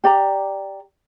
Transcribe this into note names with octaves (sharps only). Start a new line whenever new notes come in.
G4 D5 A#5